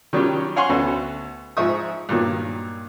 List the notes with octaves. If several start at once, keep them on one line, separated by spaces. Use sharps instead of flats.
D#3 F#3 G3 C#4 F4 G4
C#5 F5 F#5 G#5 C6 C#6
D2 B3 C#4 F#4 A4 B4
G#2 F3 E5 C#6 D#6
G2 A#2 D#3 F#3